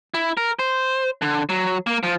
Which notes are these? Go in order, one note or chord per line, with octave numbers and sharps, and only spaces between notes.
E4
A#4
C5
D3
F#3
A#3
F3